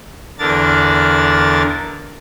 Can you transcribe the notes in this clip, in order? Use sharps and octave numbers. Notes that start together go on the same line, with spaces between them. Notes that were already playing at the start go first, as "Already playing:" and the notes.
E2 D3 D4 A#4 A6